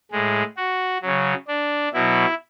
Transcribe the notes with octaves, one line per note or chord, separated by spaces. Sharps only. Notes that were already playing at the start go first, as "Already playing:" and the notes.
A2 G#3
F#4
C#3 F#3
D4
B2 F#3 E4